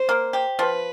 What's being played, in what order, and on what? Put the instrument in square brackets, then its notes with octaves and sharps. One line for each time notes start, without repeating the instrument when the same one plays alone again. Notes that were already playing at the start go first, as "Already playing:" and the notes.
Already playing: [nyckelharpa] C5
[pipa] A#3
G4
[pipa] F3 [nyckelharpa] B4